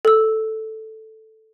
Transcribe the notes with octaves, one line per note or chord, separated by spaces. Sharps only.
A4 E6